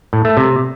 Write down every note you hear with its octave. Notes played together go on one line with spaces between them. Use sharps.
A2
A3
C3